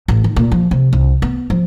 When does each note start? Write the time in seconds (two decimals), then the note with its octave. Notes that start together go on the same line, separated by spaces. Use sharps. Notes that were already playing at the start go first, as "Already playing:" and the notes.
0.08 A1
0.24 D#3
0.36 A#2
0.52 F3
0.71 C3
0.93 C2
1.22 B3
1.50 F3